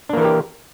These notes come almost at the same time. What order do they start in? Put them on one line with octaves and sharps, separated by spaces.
D4 A#3 E3 A#4 G4